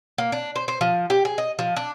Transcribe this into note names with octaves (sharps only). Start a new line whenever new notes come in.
A#3
D4
C5
C5
F3
G4
G#4
D#5
F3
D4